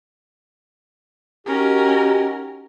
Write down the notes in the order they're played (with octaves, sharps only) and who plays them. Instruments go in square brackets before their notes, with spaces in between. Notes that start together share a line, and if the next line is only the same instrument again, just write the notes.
[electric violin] C#4 A#4 [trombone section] D#4 F#4 G4